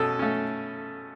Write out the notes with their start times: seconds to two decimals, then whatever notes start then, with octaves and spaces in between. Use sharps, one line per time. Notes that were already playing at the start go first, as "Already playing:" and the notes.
Already playing: B2 A3 C#4 A4
0.19 A3 C#4